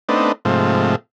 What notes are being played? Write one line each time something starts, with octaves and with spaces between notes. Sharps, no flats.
A3 B3 C4 D4 D#4
G#2 C3 F3 A3